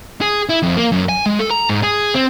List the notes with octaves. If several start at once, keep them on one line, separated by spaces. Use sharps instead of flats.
G#4
E4
F2
A#3
F#2
G#5
G#3
A4
A#5
G#2
G#4
C4